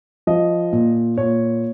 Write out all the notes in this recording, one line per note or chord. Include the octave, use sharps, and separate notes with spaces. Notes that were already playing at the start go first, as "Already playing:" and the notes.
F3 D#5
A#2
A#2 C#5